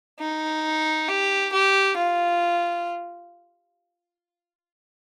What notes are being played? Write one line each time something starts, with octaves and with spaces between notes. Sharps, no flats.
D#4
G4
G4
F4